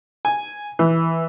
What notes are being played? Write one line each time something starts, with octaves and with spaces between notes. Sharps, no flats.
G#5
E3